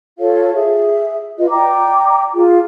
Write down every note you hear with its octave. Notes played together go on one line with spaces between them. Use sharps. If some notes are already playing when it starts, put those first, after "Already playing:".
F4 A4 C#5 F5
G#4 E5
F4 B4 D#5
D5 G5 A#5 D6
F4 G#4